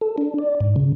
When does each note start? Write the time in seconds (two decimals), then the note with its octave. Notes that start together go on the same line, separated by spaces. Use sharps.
0.01 A4
0.18 D4
0.38 D5
0.60 G#2
0.76 C#3